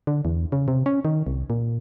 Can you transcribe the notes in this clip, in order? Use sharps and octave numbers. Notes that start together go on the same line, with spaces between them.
D3
E2
C#3
C3
C#4
D#3
C2
A#2